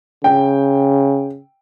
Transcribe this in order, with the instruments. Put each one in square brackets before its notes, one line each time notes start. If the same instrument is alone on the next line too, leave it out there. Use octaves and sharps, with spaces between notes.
[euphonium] C#3 [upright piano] G5